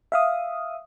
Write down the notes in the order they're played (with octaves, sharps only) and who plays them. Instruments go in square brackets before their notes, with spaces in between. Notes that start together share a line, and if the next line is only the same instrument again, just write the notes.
[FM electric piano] E5 F5 D#6